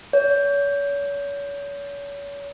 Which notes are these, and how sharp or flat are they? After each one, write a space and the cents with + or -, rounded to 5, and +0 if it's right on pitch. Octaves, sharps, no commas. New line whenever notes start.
C#5 +40